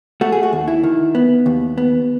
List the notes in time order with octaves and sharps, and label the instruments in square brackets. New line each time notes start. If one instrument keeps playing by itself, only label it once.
[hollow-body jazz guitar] A3 F#4
G#4
F#4
D#2
E4
D#3
B3
D#2
B3